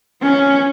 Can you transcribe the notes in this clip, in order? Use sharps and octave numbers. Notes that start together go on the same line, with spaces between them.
C#4